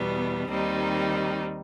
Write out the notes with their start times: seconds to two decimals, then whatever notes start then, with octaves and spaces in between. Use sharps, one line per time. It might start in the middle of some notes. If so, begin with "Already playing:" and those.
Already playing: E2 B2 G3 B3
0.48 D#2 D#3 G3 C4 D#4